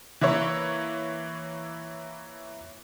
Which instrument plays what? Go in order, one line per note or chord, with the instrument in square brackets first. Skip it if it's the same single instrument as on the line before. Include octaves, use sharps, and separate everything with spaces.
[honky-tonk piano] E3 A#3 E4 C#5